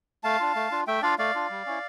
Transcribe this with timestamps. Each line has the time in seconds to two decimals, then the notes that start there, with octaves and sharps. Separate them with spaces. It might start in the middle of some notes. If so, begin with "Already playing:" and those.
0.24 A3 F5 A5
0.40 D4 F4
0.55 A3
0.71 D4 F4
0.87 A3 E5 G5
1.02 D4 F4 D5 F5
1.19 A3 D5 F5
1.35 D4 F4
1.50 G3
1.66 C#4 E4